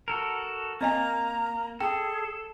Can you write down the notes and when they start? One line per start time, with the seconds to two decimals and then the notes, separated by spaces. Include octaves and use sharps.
0.08 F#4 A4 A#4
0.81 A#3 C4 D#5 G#5 A#5
1.81 G#4 A4 G5